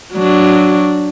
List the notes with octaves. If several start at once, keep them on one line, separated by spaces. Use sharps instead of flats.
F#3 D4